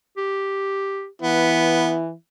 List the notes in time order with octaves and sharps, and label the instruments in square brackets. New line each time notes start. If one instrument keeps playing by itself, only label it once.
[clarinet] G4
[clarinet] E3 [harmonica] B3 [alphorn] E4